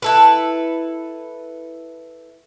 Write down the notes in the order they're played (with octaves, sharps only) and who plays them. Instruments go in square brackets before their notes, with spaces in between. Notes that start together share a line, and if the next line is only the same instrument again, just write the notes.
[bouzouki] E4 A4 B4